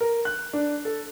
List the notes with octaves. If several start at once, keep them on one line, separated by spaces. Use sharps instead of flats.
A#4
F#6
D4
A4